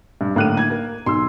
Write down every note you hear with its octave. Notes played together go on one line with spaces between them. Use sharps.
G2
A2 D3 A#3 F#6 D#7
G#6
A#4
B1 C6 E6